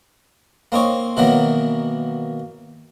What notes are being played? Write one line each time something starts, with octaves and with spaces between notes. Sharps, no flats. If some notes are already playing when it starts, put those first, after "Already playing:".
A#3 C4 D#4 C#5
B2 D#3 E3 F#3 A#3 B3